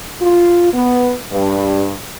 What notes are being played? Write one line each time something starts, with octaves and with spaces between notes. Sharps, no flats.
F4
B3
G2